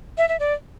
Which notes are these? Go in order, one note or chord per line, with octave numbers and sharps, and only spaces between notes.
E5
E5
D5